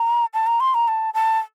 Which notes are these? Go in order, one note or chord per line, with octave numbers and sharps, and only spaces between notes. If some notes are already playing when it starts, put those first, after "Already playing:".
Already playing: A#5
A5
A#5
C6
A#5
A5
A5